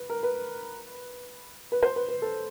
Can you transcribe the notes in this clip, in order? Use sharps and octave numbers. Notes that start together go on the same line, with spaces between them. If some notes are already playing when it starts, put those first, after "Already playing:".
Already playing: B4
A#4
B4
B4
C5
B4
B4
A4